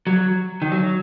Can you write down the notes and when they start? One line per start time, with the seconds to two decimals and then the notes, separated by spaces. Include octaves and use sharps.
0.07 F#3
0.62 D#3
0.72 F#3